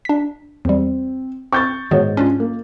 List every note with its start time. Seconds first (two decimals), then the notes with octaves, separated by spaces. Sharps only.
0.05 D4 B6
0.65 E2 G3 C4
1.53 C4 C#6 G6 A6
1.91 G#2 D#3 B3 F#4 C#5
2.17 C#4 D4 F4
2.40 A#3